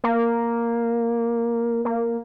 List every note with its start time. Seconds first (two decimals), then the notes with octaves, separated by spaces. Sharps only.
0.04 A#3
1.85 A#3